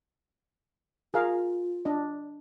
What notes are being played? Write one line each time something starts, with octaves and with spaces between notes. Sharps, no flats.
F4 G#4 A#4 F5
D4 D#5